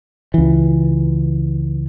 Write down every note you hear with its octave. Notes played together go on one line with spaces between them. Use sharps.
C#2 E3